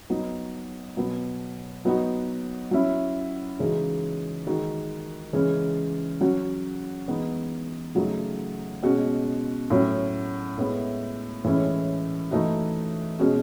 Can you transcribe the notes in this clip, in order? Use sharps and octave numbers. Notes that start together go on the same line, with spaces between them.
F#3 B3 D#4
B2 F#3 B3
F#3 B3 D#4 F#4
F#3 C#4 E4
C#3 E3 G#3 D#4 F#4
D#3 G#3 D#4 F#4
C#3 E3 G#3 C#4
F#3 C#4 F#4
E3 G#3 B3 D#4
C#3 F#3 A3 D#4 F#4
B2 G#3 C#4 F#4
A2 F#3 C#4
A2 G#3 B3 E4
A2 E3 G#3 C#4 E4
E3 A3 D#4 F#4
B2 G#3 C#4 F#4